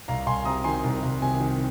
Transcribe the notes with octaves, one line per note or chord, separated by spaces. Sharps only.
C2 F5 A#5
C2 G#5 C6
C3 A#5 D#6
D#3 G#5 C6
C2
C2
C3 G#5
D#3